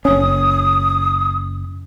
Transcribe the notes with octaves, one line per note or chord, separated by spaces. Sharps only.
F#1 C#4 D#6